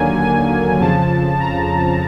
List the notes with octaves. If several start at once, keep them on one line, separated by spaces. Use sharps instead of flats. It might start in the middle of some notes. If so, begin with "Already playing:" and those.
Already playing: D#2 D3 F#3 A#3 G#5
G#5
F2 C#3 F3 A5
A#5